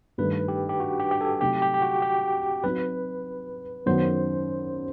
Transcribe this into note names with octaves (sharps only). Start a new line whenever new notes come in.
G2 D#3 A3 B4
G4
G4
F#4
G4
G4
A4
C3 F#3 A3 D#4 G4
G4
G4
F#4
G4
F#3 C4 D#4 F#4 B4
F#2 D#3 F#3 B3 C5